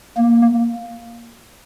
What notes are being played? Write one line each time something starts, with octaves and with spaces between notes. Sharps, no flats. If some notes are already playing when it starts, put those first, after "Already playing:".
A#3